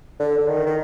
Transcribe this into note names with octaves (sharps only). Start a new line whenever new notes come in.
D3
D3
D#3
D#3